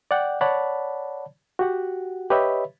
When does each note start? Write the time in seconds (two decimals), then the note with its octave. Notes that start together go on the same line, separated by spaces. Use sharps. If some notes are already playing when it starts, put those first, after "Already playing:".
0.11 D5 F#5 G5
0.41 C#5 D5 F#5 A5 B5
1.59 F#4 G4 F#5
2.30 G4 B4 C#5 D#5 E5 B5